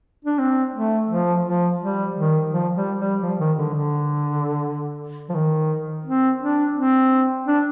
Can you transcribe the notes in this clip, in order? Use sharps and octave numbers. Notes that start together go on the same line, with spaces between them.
D4
C4
A3
F3
F3
G3
D#3
F3
G3
G3
F3
D#3
D3
D3
F3
D#3
C4
D4
C4
D4